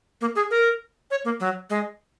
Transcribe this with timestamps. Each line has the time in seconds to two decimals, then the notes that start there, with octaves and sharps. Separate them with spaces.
0.21 A#3
0.35 G#4
0.51 A#4
1.11 C#5
1.25 A#3
1.40 F#3
1.70 G#3